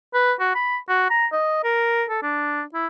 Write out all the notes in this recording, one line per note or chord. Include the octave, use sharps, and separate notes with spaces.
B4
F#4
B5
F#4
A#5
D#5
A#4
A4
D4
E4